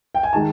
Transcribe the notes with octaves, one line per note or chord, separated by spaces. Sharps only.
G5
G#5
D#3 G#3 A5